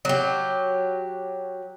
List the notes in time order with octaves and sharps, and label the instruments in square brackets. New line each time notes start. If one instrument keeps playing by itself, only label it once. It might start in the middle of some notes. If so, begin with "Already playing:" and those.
[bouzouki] F#3 G4